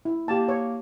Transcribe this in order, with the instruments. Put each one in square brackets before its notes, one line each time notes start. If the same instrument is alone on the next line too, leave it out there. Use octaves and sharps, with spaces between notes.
[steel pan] E4
[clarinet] A#3 [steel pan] G4 A5
[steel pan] C#5